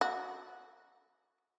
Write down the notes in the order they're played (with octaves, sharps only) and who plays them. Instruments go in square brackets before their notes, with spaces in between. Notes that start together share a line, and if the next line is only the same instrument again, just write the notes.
[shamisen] F#4